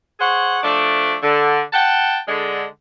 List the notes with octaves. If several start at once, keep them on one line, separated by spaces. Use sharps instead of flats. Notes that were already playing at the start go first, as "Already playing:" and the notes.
G#4 C5 C#5 F#5
F3 A3 D4
D3
F#5 G5 A5
D3 G#3